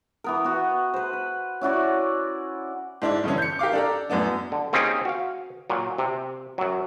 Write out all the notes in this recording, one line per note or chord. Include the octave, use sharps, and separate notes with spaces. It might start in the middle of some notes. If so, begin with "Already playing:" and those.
E3 B3 A#4
B3 F#4
B4 C5
B4
C#4 E4 F#4 D5
G#2 D4 E4
G2 D3 E3 C#4
G6 C#7
G4 A#4 F5 D6
D4 A4 A#5
F#2 A2 B3 D4
D3
A#3 C4 C#4 D#4 G4 G#4
F#4 F5
A#2 F#3
C3
F#2 F#3